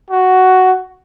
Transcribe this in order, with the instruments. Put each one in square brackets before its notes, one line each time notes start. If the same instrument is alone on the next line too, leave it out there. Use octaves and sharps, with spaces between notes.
[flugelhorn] F#4